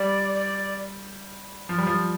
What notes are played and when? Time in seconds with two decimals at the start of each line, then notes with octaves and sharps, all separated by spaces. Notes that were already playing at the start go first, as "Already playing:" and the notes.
Already playing: G3 D5
0.35 D5
1.69 F3
1.78 G3
1.87 F3